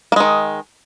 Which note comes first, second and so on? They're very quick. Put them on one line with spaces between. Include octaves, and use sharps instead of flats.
A#3 G#3 D#3